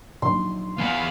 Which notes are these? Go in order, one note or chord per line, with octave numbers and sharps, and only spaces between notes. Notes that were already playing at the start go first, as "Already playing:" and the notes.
A#1 D#3 F#3 C6
B3 G#4 F5 F#5 B5